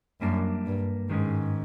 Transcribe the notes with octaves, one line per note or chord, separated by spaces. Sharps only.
F#2 G3 A#3 D4
G2
G#2 D#3 G#3 C#4